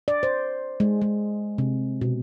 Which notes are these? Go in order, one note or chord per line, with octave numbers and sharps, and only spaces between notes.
D5
C5
G#3
G#3
C3
B2